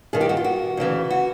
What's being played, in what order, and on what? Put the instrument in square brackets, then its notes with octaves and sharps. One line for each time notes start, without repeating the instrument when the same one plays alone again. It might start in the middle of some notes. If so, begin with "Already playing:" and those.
[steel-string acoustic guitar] G2 D#3 G#4
G4
F#4
F4
F#4
D2 C#3 E3
F#4